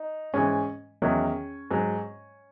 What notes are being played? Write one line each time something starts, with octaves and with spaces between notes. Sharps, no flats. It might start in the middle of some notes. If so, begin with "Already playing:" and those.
Already playing: D#4
G#2 E3 C#4
E2 D#3 F#3 C#4
G#2 F#3